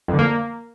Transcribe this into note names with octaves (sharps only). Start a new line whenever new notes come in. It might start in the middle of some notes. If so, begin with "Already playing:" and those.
F2
D3
A#3